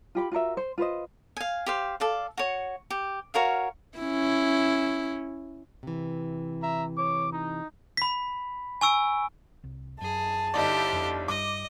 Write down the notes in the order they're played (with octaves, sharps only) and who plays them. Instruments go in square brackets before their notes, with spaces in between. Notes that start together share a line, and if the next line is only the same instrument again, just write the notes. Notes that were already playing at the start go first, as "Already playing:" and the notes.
[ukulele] F4 G4 B5
F4 F#4 A#4 E5
C5
F4 B4 C5 D#5
[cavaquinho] F5 G#5
G4 C5 F5
A4 D5 F5
F#4 C#5
G4
F#4 A#4 C#5 F5
[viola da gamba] C#4 E4
[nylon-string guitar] C3 E3
[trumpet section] E5 A#5
C#5 D6
D#4
[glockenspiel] B5 B6
G#5 C#6 E6 D7
[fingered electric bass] C2
[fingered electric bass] F#2 [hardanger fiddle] G#4 [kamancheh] A5
[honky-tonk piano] G1 D#4 D5 [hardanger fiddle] E4 G4
[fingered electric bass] F2 D4
[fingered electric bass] G2 [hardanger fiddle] D#5 [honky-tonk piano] D6